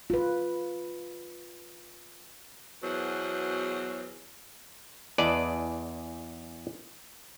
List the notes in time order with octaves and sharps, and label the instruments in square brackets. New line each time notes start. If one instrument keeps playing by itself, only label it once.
[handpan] F4 B4
[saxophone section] E2 B2 F#3 G#4 C5
[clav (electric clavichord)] E2 G#4 B4 D5 D#5 A5